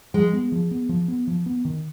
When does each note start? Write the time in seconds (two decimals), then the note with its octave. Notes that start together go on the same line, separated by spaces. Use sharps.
0.14 F3 G#3
0.33 B3
0.52 F3
0.71 B3
0.89 F3
1.08 B3
1.27 F3
1.46 B3
1.65 D#3